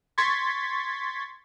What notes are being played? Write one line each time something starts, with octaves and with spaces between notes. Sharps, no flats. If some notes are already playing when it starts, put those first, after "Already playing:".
C6 C#6 G#6 A6 B6